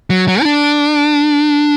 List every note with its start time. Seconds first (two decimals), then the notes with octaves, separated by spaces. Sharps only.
0.10 F#3
0.28 F#3
0.42 E4
0.45 D4